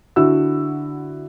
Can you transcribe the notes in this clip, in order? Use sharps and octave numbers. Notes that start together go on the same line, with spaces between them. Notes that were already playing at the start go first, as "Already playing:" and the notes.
D3 E4 F#4 E6